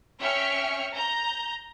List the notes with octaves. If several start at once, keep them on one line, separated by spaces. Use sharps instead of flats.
C#4 E5 G5 C#6 F6 C#7
A#5 G6